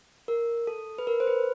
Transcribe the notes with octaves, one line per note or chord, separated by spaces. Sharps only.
A#4
A4
B4
A#4
C5
B4